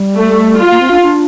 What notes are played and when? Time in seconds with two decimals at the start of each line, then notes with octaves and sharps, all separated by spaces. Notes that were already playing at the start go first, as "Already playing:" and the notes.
Already playing: G3
0.18 A3
0.60 F4
0.70 A#3
0.80 C4
0.91 D4
1.02 D4